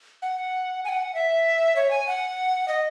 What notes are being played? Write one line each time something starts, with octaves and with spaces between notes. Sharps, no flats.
F#5
G#5
F#5
E5
C#5
G#5
F#5
D#5